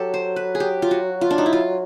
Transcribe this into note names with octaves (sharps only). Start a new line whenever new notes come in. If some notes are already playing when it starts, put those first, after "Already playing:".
Already playing: F#3 G4 A4
C5
B4
G#4
G4
F4
F#4
F4
D4
D#4
E4
F4